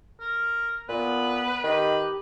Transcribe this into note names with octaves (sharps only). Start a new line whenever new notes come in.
A#4
A#2 B3 B4
D#3 G4 B4